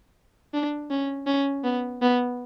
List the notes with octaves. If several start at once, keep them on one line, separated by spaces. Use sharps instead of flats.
D4
C#4
C#4
B3
B3